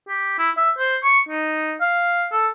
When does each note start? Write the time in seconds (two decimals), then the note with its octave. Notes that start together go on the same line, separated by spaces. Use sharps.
0.09 G4
0.39 E4
0.57 E5
0.79 C5
1.03 C#6
1.29 D#4
1.81 F5
2.32 A4